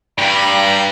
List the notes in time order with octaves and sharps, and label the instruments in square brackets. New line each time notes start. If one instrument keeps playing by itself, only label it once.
[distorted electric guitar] G2 [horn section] G3 A#5 B5